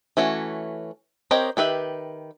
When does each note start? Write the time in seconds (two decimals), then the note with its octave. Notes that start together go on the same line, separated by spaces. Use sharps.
0.17 E3 A3 C#4 F#4
1.31 C4 G4 A#4 C#5 D#5
1.57 D#3 G4 B4 E5